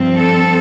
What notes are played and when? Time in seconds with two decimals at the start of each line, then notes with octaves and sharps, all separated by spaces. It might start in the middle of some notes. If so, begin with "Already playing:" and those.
Already playing: G2 F3 C4
0.17 A4